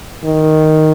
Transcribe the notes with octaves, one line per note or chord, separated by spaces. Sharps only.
D#3